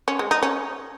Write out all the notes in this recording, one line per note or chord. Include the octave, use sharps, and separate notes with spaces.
C#4
G#3
D#4
C#4